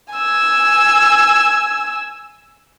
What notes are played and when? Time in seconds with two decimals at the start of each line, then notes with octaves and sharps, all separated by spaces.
0.14 G#5 E6